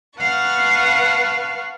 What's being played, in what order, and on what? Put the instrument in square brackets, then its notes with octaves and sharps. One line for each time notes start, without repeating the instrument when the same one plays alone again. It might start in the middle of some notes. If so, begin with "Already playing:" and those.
[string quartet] B4 F5 F#5 A5 C#6